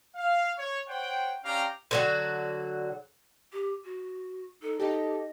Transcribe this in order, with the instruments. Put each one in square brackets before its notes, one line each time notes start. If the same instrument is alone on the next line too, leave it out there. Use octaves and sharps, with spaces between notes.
[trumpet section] F5
C#5
C5 C#5 F#5 G5
C#4 D4 G4 F5 G5 A#5
[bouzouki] D3 F#3 F#4
[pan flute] G4
F#4
[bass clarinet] D#4 [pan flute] A4
[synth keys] D#4 G4 [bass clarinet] A4 [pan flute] D#5